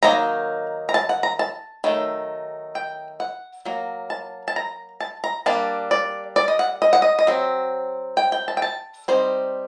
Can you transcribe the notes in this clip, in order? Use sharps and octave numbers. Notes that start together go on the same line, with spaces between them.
D#3 F#3 A#3 D#4 A#5
A#5
A5
F#5
A#5
A5
D#3 F#3 A3
G5
F#5
F#3 A#3
A5
A5
A#5
A5
A#5
G3 A#3 D4 A5
D5
D5
D#5
F#5
D#5
F#5
D#5
D#5
F#3 C4
G5
G5
A5
G5
A5
G3 C4 D#4 C5